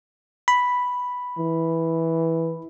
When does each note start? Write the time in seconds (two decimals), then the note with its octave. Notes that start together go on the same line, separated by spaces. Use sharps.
0.48 B5
1.39 E3